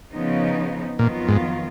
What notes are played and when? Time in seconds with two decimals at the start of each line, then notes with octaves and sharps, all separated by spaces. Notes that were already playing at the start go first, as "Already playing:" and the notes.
0.11 C#3 F3 B3 D#4
0.99 F2 A#2 D#3 F#3 B3 F4
1.28 G#2